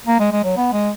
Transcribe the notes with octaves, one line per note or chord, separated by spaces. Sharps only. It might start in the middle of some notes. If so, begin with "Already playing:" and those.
A#3
G#3
G#3
F#3
B3
G#3